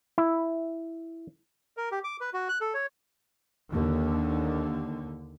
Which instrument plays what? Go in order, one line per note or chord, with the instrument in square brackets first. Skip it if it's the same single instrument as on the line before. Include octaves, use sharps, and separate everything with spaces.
[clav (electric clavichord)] E4
[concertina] A#4
G4
D6
B4
F#4
F#6
A4
C#5
[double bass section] D#2 D3